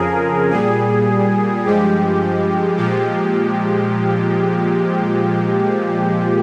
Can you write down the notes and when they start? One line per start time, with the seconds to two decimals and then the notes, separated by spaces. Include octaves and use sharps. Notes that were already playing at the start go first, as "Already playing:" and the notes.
Already playing: F2 C#3 F3 G#4 A#4
0.51 A#2 G3 G#4
1.64 G2 F3 G#3 G4
2.78 A#2 F3 G#3 G4